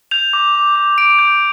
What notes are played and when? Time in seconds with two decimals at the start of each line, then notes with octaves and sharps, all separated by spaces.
0.11 G6 F7
0.33 D6
0.55 D6
0.76 D6
0.98 D6 D7
1.19 G6